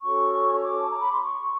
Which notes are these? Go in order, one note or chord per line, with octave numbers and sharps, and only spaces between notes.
C#4 F#4 A4 C#5 C#6
D6
A5
A#5
B5
C6
C#6